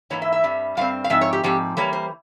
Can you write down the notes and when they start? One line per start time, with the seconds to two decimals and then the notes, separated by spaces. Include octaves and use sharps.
0.10 G#2 E3 A#3 E4 C#5
0.22 E5
0.32 E5
0.43 G2 G3 C4
0.77 G2 G3 C4 F5
1.04 F5
1.10 G#2 F3 C4 E5
1.21 C#5
1.33 G4
1.44 G#2 F3 C4 G4
1.77 E3 G3 A#3 C#5
1.93 C5